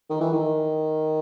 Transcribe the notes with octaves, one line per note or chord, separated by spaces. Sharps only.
D#3
E3
D#3